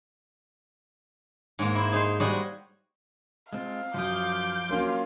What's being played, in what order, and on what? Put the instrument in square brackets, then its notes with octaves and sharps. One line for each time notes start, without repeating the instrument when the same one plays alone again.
[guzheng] G#2 A#3
E4 C5
D#4 G#4 C5
G3 G#3 F#4 G4 D#5
[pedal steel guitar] G#3 C4 F4 [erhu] F5
[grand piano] F#2 [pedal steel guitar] F3 D#6 [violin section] D6 G6
[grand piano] F#3 A#3 C#4 [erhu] F4